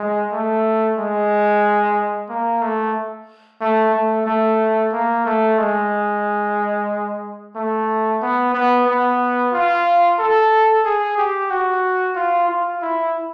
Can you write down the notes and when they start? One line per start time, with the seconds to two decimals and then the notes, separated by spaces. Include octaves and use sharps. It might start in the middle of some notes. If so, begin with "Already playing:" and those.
Already playing: G#3
0.32 A3
0.98 G#3
2.30 A#3
2.62 A3
3.61 A3
3.94 A3
4.26 A3
4.93 A#3
5.26 A3
5.59 G#3
7.56 A3
8.22 B3
8.54 B3
8.87 B3
9.53 F4
10.19 A4
10.85 G#4
11.18 G4
11.51 F#4
12.16 F4
12.49 F4
12.82 E4